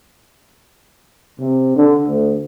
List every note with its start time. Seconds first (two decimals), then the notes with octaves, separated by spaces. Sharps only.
1.40 C3
1.76 D3
2.08 D2